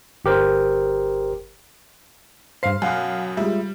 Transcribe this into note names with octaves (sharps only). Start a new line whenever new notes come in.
G1 G4 A#4 C5
G2 C5 F5 C7
F#2 B2 F5 F#5 G#5
G3 G#3 F4 E5